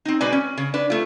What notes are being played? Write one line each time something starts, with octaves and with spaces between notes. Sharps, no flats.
C4 D#4
B2 G#3 B4 D5 G#5
C#4
C#3
D4 B4
A3 F4